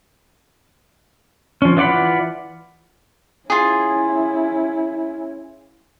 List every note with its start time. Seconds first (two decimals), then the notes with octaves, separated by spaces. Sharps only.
1.62 F3 C#4
1.77 E3 F4 D5 F#5 B5
3.50 C#4 E4 F4 G#4